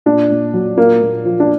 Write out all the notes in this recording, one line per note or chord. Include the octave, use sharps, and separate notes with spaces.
A#2 D4
A#2
F#3
A#2 A#3
A#2
F3
D4